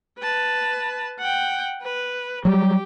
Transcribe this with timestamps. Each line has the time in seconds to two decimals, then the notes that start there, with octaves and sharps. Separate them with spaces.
0.18 B4 A5
1.19 F#5 G5
1.82 B4
2.45 F#3 G3 G4